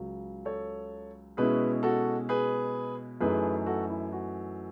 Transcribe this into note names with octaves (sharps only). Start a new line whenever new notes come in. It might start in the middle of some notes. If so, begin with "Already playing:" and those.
Already playing: C#2 C#3 F#3
A4 C#5
B2 G#3 C#4 E4 G#4 B4
F#4 A4
G#4 B4
F#2 E3 A3 D#4 G#4 B4
F#4 A4
E4
F#4